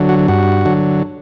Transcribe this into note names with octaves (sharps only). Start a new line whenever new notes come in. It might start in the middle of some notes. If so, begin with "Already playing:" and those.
Already playing: D3 F#3
F#4
G2 F#4
D3 F#3